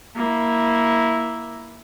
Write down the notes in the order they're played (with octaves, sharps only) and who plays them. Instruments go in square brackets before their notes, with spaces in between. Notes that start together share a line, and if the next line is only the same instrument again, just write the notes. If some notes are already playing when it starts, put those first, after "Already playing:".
[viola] A#3 E4